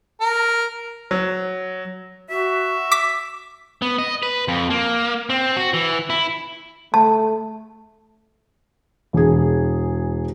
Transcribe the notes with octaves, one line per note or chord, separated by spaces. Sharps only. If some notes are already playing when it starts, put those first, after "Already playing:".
A#4
F#3
F#4 E5
D6 B6
B3
D#5
B4
F2
A#3
C4
F#4
E3
E4
A3 A5
E1 G#4